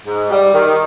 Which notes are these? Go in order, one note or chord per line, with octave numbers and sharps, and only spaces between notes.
G#2
G3
D#3